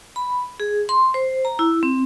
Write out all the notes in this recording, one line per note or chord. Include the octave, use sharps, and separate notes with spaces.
B5
G#4
C6
C5
A#5
E4
C4